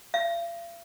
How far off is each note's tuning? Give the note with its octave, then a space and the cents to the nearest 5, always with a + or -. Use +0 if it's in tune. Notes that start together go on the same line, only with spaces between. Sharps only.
F5 -40